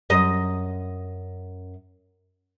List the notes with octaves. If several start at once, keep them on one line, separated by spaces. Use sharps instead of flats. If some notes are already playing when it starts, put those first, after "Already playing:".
F#2 D#5